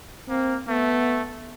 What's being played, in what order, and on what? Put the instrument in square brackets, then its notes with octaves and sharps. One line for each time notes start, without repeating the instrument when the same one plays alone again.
[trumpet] A#3 [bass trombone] C4
[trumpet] A3 [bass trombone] B3